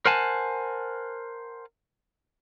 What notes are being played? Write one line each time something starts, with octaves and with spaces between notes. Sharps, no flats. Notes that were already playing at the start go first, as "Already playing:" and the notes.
A#4 C5 F#5 G#5 A5